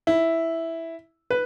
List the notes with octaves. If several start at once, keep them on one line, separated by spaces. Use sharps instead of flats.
E4
B4